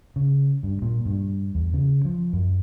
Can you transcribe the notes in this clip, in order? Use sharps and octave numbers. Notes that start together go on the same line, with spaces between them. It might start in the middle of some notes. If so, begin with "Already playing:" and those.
C#3
G2
A#2
G2
E2
C#3
F3
F#2